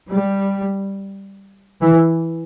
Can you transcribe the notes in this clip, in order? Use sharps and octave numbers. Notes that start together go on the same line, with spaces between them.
G3
E3